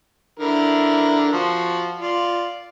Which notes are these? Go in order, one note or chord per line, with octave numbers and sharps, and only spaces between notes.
D3 E4 A#4
F3 F#4
F4 D5